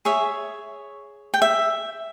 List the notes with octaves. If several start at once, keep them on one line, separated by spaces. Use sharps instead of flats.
G#4 C#5 E5
G5
E5